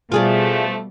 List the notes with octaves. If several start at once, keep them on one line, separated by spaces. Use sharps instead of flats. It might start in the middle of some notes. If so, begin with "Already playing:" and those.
B2 F3 G3 A3 F4 G#4 D5